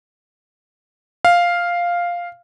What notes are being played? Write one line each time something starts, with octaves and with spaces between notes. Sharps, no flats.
F5